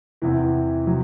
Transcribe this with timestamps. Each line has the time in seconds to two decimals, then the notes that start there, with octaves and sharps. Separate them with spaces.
0.22 E2 C3 E3
0.87 C3 F#3